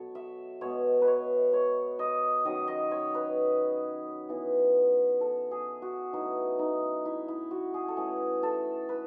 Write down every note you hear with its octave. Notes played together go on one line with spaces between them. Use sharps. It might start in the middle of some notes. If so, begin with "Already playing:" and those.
Already playing: B2 F#3 B3 A4 C#5
E5
B2 G#3 B3 C#5
B4
C#5
C#5
D#5
D#3 F#3 C#4 D#5
D#5
C#5
B4
E3 B3
A4
G#4
F#4
E3 A3 C#4 D#4
D#4
E4
E4
F#4
G#4
A4
E3 A3 C#4 G#4
A4
B4